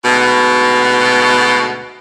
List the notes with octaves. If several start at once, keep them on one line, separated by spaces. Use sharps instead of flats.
D2 G#2 B2